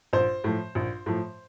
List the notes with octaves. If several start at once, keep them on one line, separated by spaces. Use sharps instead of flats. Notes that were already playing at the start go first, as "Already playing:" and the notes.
A#1 C5
A2 F3
A#1
A2 F3